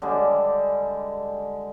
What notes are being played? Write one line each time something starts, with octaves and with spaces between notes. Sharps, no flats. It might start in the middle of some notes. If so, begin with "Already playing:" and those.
D3 G3 G#3